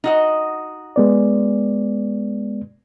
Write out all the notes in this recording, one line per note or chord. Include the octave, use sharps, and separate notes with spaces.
D#4 F#4 D#5
G#3 B3 D5